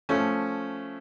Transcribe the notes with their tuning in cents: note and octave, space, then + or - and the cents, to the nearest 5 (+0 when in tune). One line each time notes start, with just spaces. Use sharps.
F3 +0 A3 +0 C#4 +0